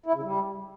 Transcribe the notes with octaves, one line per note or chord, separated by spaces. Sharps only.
E4
C#3
G3